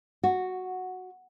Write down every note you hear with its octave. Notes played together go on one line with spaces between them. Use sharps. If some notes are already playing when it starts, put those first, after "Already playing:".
F#4